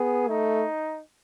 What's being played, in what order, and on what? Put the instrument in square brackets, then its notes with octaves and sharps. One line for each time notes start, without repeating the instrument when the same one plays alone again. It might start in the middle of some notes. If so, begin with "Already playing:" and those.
Already playing: [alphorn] B3 [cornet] G#4
[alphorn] A3 [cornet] D#4